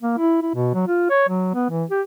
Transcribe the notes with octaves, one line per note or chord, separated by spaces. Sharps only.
A#3
E4
E4
B2
F#3
F4
C#5
F#3
B3
E3
G4